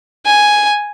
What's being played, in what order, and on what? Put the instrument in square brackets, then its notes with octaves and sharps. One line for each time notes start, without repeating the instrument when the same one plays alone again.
[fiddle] G#5